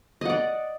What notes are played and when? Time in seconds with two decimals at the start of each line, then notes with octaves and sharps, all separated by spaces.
0.21 D#5
0.25 F#5
0.30 D5